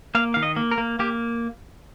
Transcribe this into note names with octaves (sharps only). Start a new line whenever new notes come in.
A#3 F5
D#3 F5
D#5
A#3
A#4
A#3
A#3 G4